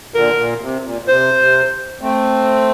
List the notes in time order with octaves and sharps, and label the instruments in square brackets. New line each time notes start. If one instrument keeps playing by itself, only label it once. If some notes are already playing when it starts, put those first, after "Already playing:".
[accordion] A#2 D3 [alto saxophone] A#4
[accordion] A#2
C3
A#2
A#2
[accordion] C3 [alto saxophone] C5
[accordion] C3
A3 C4